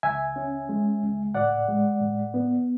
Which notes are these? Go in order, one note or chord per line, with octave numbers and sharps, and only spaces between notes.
C#2 E5 G#5
C#4
G#3
C#2
A2 D5 F#5
G#3
A2
B3